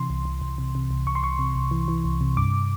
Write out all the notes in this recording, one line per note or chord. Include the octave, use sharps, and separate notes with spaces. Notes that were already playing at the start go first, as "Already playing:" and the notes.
Already playing: C3 E3 C6
C2
C2
C2
C3
C3
C2
C2 C#6
C6
C2 C#6
C3
C2
E3
E3
C2
C3
G2 D6